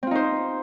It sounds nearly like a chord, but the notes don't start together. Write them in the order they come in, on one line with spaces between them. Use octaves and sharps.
C4 F4 D#4 C5